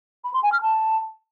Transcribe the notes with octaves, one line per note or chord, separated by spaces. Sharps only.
B5
C6
G#5
F6
A5